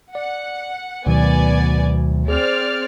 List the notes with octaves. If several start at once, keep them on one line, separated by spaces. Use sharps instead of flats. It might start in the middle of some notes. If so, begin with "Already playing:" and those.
D5 F#5
D2 B2 D#3 F#3 B3 D5 G#5
C4 G#4 D5 F6